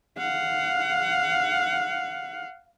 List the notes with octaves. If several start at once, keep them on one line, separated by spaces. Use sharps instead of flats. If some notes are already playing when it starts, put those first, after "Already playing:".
F5 F#5